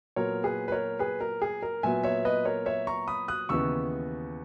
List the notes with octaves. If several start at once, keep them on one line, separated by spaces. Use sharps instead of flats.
A#2 F#3 B3 A#4 C#5
G#4 B4
B4
A#4 C#5
G#4 B4
A#4
G#4
A#4
A#2 F#3 B3 E5 G#5
C#5 E5
B4 D#5
A#4 C#5
C#5 E5
A#5 C#6
B5 D#6
D#6 F#6
D#2 C#3 E3 B3 C#6 E6